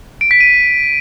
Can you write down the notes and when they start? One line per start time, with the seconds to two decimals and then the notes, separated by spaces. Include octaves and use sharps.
0.21 D7
0.31 B6
0.41 D#7